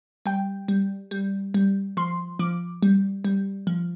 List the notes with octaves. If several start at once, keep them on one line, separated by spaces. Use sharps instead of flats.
G3 G5
G3
G3
G3
F3 C6
F3 D6
G3
G3
F3